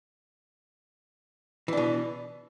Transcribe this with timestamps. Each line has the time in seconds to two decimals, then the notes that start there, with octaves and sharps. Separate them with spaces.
1.68 E3
1.73 D4
1.77 B2